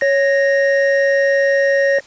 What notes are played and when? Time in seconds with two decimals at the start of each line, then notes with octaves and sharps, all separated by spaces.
0.01 C#5 A#6